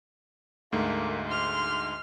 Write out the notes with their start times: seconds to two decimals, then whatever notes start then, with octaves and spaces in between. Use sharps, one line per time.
0.72 D2 G#2 A3 A#3
1.27 C6 F6